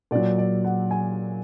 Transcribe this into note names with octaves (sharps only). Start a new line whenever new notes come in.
A#2 F#3 D5
D5
F#5
G#5